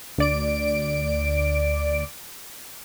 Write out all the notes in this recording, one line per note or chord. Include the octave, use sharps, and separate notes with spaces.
D2 D5 D7